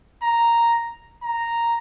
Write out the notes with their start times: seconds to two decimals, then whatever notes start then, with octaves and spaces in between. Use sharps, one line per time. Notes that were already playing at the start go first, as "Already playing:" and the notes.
0.23 A#5
1.23 A#5